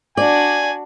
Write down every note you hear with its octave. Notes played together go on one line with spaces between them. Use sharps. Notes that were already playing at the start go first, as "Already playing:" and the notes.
D4 F#4 D5 G#5